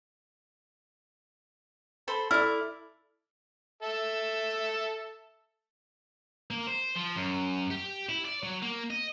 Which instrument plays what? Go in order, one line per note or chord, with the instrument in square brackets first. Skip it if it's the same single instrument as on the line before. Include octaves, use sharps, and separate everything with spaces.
[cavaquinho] A4 C5 B5
[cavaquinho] E4 D6 [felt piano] A4 D5 F6
[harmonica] A4 E5
[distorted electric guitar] A#3
C5
F3
F#2
G4
E4
D5
F#3
A#3
D#5